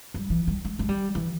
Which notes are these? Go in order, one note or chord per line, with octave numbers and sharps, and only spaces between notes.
G3
E3
G3
G#3
G#3
G3
E3